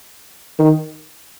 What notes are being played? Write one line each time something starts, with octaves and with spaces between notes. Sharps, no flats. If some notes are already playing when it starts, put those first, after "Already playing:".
D#3